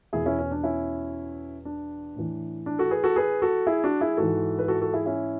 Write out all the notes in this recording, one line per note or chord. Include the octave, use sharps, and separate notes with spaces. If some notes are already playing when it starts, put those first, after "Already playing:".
E2 B2 E4 G#4
C#4 E4
C#4
D4
C#4 E4
D4
A2 E3
D4
F#4 A4
G#4 B4
F#4 A4
G#4 B4
F#4 A4
E4 G#4
D4 F#4
E4 G#4
G#2 E3 F#4 A4
B4
F#4 A4
F#4 A4
E4 G#4
C#4 E4